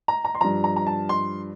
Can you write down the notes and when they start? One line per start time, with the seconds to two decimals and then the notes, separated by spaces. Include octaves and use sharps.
0.08 A#5
0.25 A#5
0.35 C6
0.41 G2 F3 A#5
0.64 A#5
0.76 A#5
0.87 A5
1.09 C6